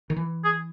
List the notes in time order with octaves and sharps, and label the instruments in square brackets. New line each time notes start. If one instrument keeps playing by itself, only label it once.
[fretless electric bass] D#3
E3
[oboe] G#4